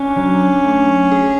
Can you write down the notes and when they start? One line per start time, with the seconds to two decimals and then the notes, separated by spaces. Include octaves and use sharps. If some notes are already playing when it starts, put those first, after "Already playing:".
Already playing: C#4 D4
0.16 F#3
0.65 A3
1.11 G#4